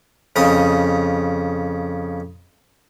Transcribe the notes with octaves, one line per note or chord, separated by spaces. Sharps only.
F2 C#3 D#5 D#6